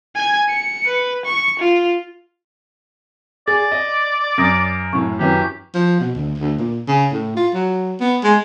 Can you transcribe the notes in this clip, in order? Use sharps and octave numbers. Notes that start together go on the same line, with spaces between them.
G#5 G#6
C#7
B4
C#6
F4
G#4 D5 A6
D#5
F#2 D#6 A#6 D7
F#2 A2 C#6
F#2 E3 F#3 G4
F3
B2
D2
D2
A#2
C#3
A2
F4
F#3
B3
G#3